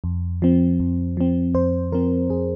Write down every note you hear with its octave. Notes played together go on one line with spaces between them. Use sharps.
F2
F3 C4
F2
F3 C4
F2 C5
F3 C4 A#4
F2 G#4